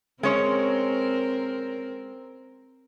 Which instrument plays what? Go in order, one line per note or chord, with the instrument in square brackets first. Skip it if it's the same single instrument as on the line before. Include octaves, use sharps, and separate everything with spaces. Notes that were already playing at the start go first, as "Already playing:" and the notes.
[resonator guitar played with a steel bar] G#3 C#4 C#5 [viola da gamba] C4 A#4